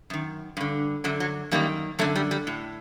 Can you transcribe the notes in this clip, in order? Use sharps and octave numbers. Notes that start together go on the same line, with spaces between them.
F#2 D#3
G2 D3
F#2 D3 F#3
F#3
F#2 D#3 G3 A#3
F#2 D3 F#3 A3
G3
G3
A2